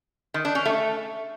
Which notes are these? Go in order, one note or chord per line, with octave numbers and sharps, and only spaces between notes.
D#3
D4
C#4
A3